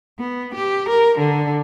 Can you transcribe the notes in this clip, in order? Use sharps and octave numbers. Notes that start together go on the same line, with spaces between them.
B3
G4
A#4
D3